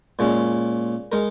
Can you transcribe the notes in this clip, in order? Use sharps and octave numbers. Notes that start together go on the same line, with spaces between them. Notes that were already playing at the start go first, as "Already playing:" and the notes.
A#2 G#3 C#4
G#3 D#4 A#4